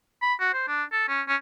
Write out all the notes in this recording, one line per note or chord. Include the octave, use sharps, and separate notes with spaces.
B5
F#4
C5
D4
A4
C#4
C#4